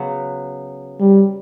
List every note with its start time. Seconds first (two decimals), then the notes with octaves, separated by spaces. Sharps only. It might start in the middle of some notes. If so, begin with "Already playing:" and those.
Already playing: C#3 F#3 B3
1.00 G3